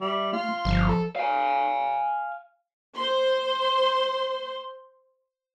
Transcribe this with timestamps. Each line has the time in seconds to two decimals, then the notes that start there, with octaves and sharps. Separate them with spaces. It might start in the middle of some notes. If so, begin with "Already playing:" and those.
0.01 G3 E5
0.33 A3 F4
0.49 C6
0.65 G1 F3
0.88 A4
1.16 F5 G#5
2.95 C5 C6